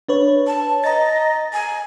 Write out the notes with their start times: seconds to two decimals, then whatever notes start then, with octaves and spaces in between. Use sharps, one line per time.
0.08 D4 B4 C#5
0.47 A5
0.84 D#5 A#5 A6
1.53 G#5